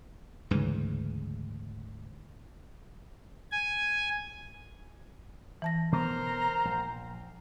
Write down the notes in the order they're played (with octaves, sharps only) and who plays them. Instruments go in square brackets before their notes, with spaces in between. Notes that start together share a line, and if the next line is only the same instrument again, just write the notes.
[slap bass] D2 G#2 C#3 E3
[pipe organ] G#5
[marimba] E3 A5 A#6
[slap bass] B2 B3 [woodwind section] A#4 C5 A#5
[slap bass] A#1